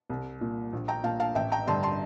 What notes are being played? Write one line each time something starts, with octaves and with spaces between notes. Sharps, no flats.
C2
A#2
A#1
G5 A#5
A#2 F5 A5
F5 A5
A1 E5 G5
G5 A#5
G2 D3 A5 C6
A5 C6